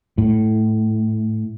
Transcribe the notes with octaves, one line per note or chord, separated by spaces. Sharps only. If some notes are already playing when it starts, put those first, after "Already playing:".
A2